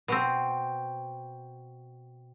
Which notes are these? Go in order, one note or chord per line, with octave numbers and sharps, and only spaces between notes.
B2 C4